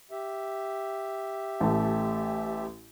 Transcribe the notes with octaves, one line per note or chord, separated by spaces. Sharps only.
G4 E5
A1 A3